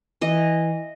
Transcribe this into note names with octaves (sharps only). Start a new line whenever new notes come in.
E3 D#5